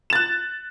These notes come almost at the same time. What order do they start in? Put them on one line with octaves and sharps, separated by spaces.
E7 A6 F#6